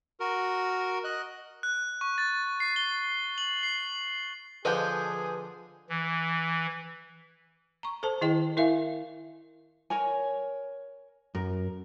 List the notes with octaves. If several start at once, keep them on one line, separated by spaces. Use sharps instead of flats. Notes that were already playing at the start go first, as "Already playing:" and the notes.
F#4 A#4
D#5 F#6
F#6
C#6
A6
C7
G7
F#7
C7
D3 F3 G#4 B4 D#5 G5
E3
A#5 C#6
A4 C5 A5
D#3 E4 G#4 D#5 G5
E4 A#4 E5 F5 G#5
A#4 C#5 G#5
F#2 A#4